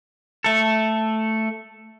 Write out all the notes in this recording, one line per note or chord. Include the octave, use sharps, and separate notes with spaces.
A3 A4